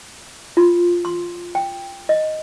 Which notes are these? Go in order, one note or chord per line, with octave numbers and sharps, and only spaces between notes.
F4
C6
G5
D#5